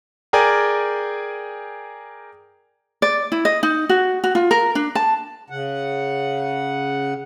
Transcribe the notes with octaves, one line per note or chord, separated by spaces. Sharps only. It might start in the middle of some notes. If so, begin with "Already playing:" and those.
G#4 A#4 D5 G5 G#5
D5
E4
D#5
D#4
F#4
F#4
F4
A#4
D4
A5
C#3 F#5